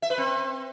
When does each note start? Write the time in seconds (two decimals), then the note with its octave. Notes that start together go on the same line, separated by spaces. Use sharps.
0.02 E5
0.10 B4
0.18 C4